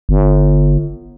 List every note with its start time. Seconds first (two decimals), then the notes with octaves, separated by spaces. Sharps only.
0.09 G1